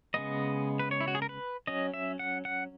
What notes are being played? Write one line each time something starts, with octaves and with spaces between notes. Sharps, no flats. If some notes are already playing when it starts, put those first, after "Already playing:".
C#3 G#3 B3 D#5
B4
C#5
E4
F#4
G#4
A#4
B4
F#3 C#4 D#5
E5
F#5
F#5